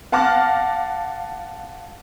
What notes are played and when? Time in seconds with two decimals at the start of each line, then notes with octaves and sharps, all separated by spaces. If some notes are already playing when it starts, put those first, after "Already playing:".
0.12 F5 F#5 A5 D6 F6 A#6